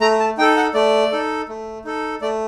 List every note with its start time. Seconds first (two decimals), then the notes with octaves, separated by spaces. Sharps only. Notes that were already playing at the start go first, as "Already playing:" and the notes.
0.01 A3 A#5
0.20 A5
0.38 D#4 G5
0.41 A4
0.57 F#5
0.74 A3 D5
1.12 D#4 A4
1.49 A3
1.85 D#4 A4
2.22 A3 D5